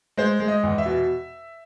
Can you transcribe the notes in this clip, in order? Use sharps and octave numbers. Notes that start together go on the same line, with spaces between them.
G#3 C5
G#3
D#5
E2
E5
B2